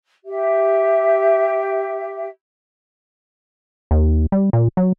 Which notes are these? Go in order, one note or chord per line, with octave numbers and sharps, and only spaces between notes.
G4 E5
D#2
G3
A#2
F#3